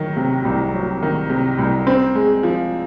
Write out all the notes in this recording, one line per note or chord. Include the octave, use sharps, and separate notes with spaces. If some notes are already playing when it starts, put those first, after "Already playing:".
Already playing: D#3 F#3
C3
C2
F#3
D#3
C3
C2
C4
G#3
F3